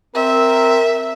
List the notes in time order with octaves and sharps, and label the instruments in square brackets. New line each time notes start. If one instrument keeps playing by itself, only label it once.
[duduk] C4 [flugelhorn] A#4 [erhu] E5